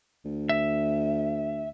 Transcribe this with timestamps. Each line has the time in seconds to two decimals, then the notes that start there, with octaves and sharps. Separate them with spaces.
0.25 D2
0.49 E5